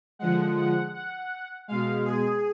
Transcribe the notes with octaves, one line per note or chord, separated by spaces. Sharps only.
D3 F3 G#3 F#5
F#5
F#5
B2 G#3 F5
G#4